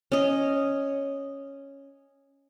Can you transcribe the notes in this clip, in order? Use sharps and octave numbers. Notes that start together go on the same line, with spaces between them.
C#4 D#5